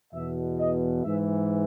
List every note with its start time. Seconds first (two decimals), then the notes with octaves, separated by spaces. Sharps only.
0.13 E2 B2 E5
0.58 D#5
1.03 G#2 E3 E5